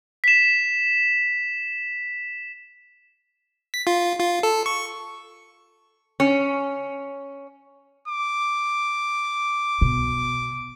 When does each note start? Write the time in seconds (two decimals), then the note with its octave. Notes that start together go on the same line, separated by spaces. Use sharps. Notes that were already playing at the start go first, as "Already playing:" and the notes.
0.24 B6 E7
3.74 B6
3.87 F4
4.20 F4
4.43 A4
4.66 C#6
6.20 C#4
8.08 D6
9.81 B2